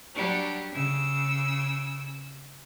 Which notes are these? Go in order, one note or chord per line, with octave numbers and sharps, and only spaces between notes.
F#3 G3 D4
C#3 E6